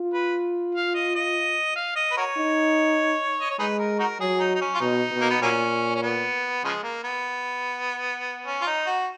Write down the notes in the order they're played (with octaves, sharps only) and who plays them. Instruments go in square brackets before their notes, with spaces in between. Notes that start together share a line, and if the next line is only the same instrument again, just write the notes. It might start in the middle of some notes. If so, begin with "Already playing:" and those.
Already playing: [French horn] F4
[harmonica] B4
F5
D#5
D#5
F5
D#5
B4
F#4 A#4 C#5
[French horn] D#4
[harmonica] D#5
C#5
[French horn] G#3 [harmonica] D#4 G#4 B4
[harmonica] A#4
D#4 F#4 A#4
[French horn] F#3 [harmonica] G#4
[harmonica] D#4
D#4
C#4
F4
[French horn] B2 [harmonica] D#4
[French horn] B2
[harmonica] A#3
B3
[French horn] A#2 [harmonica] F#3 A#3 C#4
[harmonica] C#4
B3
C#3 F3 G#3
A#3
B3
C#4
F4
D#4
F#4